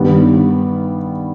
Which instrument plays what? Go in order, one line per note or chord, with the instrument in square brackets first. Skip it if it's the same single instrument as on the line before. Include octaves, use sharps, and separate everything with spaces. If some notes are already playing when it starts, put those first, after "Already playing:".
Already playing: [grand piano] G2 D#3 G3 B3